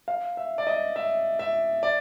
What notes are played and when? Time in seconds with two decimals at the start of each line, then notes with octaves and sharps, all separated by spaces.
0.08 F5
0.37 E5
0.58 D5
0.67 D#5
0.96 E5
1.39 E5
1.83 D5